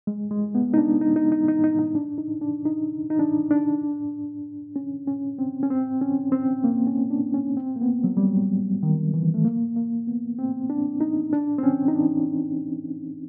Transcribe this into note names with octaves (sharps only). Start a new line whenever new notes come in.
G#3
G#3
B3
D#4
D4
D#4
D#4
D#4
D#4
D#4
D#4
D4
D#4
D4
D#4
D#4
D4
D4
C#4
C#4
C4
C#4
C4
C#4
C4
A#3
C#4
D4
C#4
C4
A#3
B3
F#3
G3
F#3
D#3
E3
A3
A#3
A#3
B3
C4
D4
D#4
D4
C4
C#4
D#4
D4